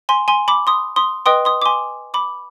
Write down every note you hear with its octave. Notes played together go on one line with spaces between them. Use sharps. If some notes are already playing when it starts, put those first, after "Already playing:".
G#5 C6
G#5 C6
B5 D6
C6 D#6
C6 D#6
B4 D#5 G5 C6 D#6
C6 D#6
D6
G#5 C6
B5 D6